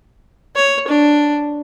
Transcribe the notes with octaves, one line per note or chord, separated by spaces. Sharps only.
C#5
D4